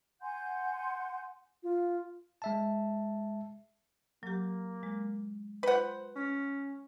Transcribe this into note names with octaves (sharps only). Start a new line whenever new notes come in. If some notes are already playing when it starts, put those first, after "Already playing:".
F#5 G#5 C6 G6
F4
G#3 E5 A5
F#3 A#3 G4
G#3
F4 B4 C5 F#5 G5
C#4